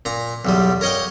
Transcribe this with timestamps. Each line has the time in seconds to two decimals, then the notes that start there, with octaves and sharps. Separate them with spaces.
0.05 A#2 A#5
0.45 B1 E2 G3
0.81 A#4 C#5 D#5 F5 G5